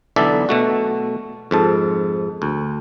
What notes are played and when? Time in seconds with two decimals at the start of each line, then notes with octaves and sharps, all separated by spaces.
0.16 B1 D3 E3 D5 E5 A5
0.49 B2 A3 F#4
1.51 F2 G#2 A5
2.42 D2